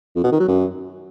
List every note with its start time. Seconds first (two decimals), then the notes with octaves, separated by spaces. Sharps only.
0.16 F2
0.24 B2
0.32 D#3
0.40 F#3
0.48 F#2